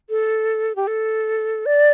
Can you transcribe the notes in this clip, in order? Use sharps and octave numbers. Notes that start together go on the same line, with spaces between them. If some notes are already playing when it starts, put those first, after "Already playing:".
A4
G4
A4
D5